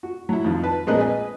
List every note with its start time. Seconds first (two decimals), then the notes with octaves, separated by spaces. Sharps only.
0.03 F#4
0.29 F#3 E4
0.44 F2 D#3 F4
0.63 B4 A5
0.87 A#1 G#3 C4 A#4 D#5 F#6
1.00 B4 D#5 G#5